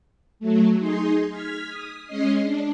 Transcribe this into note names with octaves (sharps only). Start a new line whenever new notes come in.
F#3 A3
D#4 G#4 C6
F6 G#6 B6
D#6
G#3 C#4 D#5 C7
D4